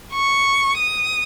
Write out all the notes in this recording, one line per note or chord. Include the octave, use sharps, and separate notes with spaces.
C#6
D#6